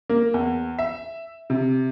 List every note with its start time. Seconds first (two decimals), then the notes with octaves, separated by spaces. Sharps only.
0.09 A#3
0.34 E2
0.78 E5
1.50 C3